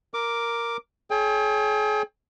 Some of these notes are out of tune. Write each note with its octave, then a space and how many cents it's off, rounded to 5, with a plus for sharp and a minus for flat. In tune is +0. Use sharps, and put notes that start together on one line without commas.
A#4 +0 D6 +0
G#4 +40 C#5 +0 G5 +35